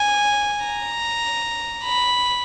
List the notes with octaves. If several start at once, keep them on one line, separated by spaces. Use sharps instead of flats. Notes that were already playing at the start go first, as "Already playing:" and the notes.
Already playing: G#5
A#5
B5